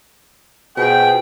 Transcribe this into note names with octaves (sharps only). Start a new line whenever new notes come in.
B2 F4 G#4 B4 C5 G5